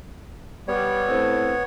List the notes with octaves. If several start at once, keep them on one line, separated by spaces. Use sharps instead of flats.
G3 B3 C#5
A2 C4